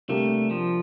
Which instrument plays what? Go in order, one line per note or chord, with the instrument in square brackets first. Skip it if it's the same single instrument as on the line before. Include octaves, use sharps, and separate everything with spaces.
[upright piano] C3 G3 A#3 D4 G4 [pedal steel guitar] A3
[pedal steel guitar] F3